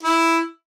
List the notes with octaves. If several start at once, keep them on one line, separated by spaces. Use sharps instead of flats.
E4